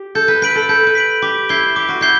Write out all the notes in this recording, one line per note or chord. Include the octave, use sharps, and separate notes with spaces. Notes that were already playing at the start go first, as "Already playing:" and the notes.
Already playing: G4
A4 G6
B4
B4 B6 D7 F#7
A4
A4 G6
B4
B6 D7 F#7
G4 D6
E4 G6 C7 G7
G4 D6
F#4
E4 G6 C7 G7